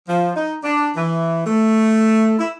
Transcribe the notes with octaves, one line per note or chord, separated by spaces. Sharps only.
F3
D#4
D4
E3
A3
E4